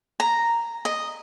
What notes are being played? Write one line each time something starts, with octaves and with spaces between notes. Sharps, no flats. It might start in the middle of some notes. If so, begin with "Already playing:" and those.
A#5
D#5